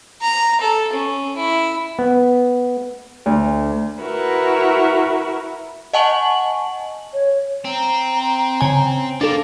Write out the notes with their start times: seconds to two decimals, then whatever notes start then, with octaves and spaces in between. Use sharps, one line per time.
0.21 A#5
0.61 A4
0.93 C#4
1.36 E4
1.99 B3
3.26 D2
4.02 E4 F#4 A#4 B4 E5
5.93 D#5 F#5 G#5 A5 C#6 F#7
7.14 C#5
7.65 C4 A#5
8.61 C#3 G#5
9.21 C2 A#3 D4 A4